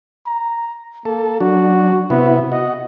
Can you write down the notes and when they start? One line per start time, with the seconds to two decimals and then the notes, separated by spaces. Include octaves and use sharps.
0.26 A#5
1.05 A#3 A4
1.40 F#3 D4 F#4
2.10 C3 B3 E4
2.52 F#4 D#5